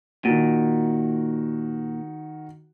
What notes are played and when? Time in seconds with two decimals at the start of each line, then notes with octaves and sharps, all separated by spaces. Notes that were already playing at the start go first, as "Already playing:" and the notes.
0.25 A#2 D#3 F#4